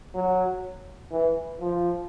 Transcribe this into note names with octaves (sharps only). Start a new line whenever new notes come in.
F#3
E3
F3